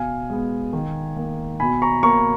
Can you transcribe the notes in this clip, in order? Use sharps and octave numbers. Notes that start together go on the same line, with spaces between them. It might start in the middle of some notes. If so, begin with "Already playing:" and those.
Already playing: B2 F5 G#5
G#3 B3
D#3
A#3
B2 G#5 B5
A#5 C#6
A#3 A#5 C#6